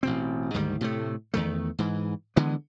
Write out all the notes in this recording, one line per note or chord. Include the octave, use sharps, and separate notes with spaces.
A1 B2 C4
D2 G#2 D#3 G3
A2 C3 A3
E2 D#3 A3
G#2 E3
D3 E3 G#3 B3